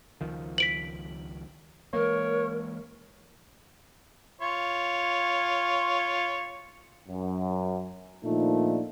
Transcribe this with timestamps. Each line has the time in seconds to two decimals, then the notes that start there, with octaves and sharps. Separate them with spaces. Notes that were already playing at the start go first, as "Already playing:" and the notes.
0.21 C#2 D#3 F3
0.58 B6 D7 F#7
1.93 E3 G#3 A#3 A#4 C#5
4.42 F4 C#5
7.08 F#2
8.24 A#2 D#3 F3 A3 D4 D#4